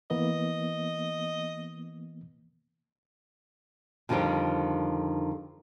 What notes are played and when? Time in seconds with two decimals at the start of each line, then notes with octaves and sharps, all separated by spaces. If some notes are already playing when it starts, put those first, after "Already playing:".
0.10 E3 A#3 B3 D#5
4.09 F2 D3 D#3 F3 G3 G5